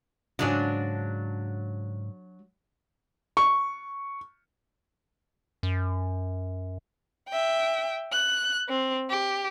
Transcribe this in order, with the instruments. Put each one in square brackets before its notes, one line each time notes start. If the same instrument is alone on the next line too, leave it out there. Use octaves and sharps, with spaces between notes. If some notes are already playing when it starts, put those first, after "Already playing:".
[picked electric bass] G#2 C#3 [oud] F#3 D4 G#4
[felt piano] C#6
[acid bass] F#2
[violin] E5 G5
F#6
C4
G4